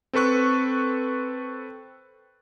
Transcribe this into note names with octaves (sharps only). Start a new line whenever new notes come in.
C4 A4 B4 C#6 F#6